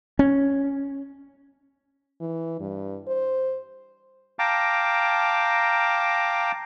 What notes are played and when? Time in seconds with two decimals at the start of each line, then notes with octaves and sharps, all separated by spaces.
0.19 C#4
2.21 E3
2.60 G2
3.08 C5
4.39 F5 G5 A5 A#5 D6